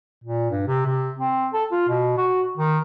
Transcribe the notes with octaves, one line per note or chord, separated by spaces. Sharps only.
A#2
G2
C3
C3
C4
A4
F4
B2
F#4
D#3